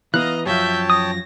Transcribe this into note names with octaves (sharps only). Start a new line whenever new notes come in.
E3 B3 D#5 F5 A#5 F#6
F#2 F3 C#5 E5 G5 A5 G6
D#6 A#6